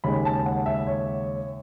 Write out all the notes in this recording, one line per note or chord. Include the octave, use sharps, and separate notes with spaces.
D#2 C#3 G#3 B5
A5
F#5
E5
C#5